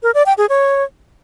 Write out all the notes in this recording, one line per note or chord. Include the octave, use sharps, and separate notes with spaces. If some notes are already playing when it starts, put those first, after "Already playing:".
A#4
D5
G5
G#4
C#5